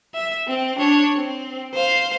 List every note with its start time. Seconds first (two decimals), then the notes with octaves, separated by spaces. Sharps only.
0.14 E5
0.48 C4
0.78 D4 C#5
1.16 C4
1.74 C5 F5